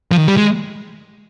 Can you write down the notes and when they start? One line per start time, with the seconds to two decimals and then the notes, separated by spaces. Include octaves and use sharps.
0.12 F3
0.18 D#3
0.28 G3
0.37 G#3